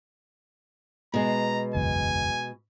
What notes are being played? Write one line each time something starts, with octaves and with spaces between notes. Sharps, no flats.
B2 G#3 A#5
F#1 B1 E2 G#5